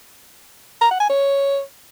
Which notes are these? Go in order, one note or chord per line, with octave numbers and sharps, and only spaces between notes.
A#5
F#5
G#5
C#5